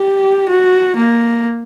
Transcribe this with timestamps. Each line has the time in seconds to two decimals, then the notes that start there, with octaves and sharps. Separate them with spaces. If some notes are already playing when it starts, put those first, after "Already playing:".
Already playing: G4
0.49 F#4
0.97 A#3